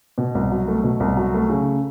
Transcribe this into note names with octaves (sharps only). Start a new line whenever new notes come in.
B2
C2
F#3
A3
B2
C2
F#3
A3
C#3